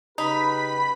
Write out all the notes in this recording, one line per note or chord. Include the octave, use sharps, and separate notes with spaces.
C#3 D#4 G4 B4 B5 B6